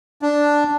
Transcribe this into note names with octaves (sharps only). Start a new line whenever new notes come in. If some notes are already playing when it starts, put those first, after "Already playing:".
D4